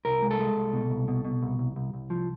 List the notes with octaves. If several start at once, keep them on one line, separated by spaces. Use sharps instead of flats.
C2 A#4
G#3
A4
G#3
C2
B2
C2
B2
B2
C2
C2
C2
C2
F3